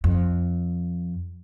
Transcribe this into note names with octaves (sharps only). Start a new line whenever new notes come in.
F2